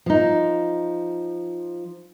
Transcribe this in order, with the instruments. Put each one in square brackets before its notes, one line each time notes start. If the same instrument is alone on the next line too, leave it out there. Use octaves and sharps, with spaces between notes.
[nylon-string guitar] F3 D#4